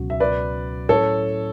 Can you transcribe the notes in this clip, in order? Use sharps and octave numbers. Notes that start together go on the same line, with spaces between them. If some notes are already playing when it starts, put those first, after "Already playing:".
Already playing: C#2 B2 F#3 C#4 F#4
E5
B4 D5
A2 F#3 C#4 E4 A4 C#5